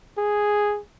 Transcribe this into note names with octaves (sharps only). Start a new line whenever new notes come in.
G#4